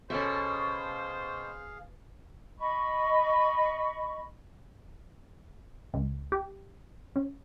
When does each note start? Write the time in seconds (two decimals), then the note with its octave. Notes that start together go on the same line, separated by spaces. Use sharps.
0.10 B2 C#4 G#4 A4 C5 E5 F5
2.59 D#5 B5 C#6
5.94 C#2
6.32 G4
7.16 C#4